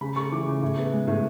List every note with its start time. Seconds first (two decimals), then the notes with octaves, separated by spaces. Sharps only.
0.01 C#3 B5
0.16 A3 C#6
0.32 E3 D6
0.46 C#3
0.62 A2
0.77 B3
0.92 G#3
1.07 A2